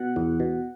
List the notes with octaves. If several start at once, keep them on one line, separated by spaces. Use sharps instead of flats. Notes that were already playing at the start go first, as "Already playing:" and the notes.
Already playing: B2 F#5
E2
B2